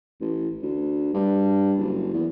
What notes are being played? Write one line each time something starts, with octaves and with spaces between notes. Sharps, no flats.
A1
D2
G2
F#1
E2